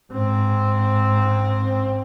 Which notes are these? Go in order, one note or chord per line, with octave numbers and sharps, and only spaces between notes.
G#2 C4